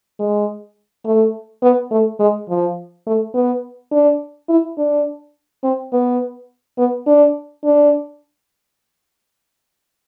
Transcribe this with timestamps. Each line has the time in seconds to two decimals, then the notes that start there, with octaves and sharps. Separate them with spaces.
0.19 G#3
1.06 A3
1.62 B3
1.91 A3
2.19 G#3
2.49 F3
3.07 A3
3.34 B3
3.92 D4
4.49 E4
4.78 D4
5.64 C4
5.93 B3
6.78 B3
7.07 D4
7.64 D4